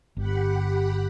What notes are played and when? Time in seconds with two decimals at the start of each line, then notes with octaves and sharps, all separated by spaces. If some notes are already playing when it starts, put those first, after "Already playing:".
0.17 G1 G4 F#5 B5